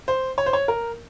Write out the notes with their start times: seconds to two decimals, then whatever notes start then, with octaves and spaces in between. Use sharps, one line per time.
0.08 C5
0.38 C#5
0.46 C5
0.53 C#5
0.68 A#4